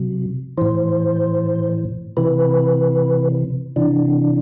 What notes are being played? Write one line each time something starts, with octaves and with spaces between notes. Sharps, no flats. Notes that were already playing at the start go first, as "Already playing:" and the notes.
Already playing: C3 F#3
A2 E3 C5
C3 E3 B4
C3 E3 D4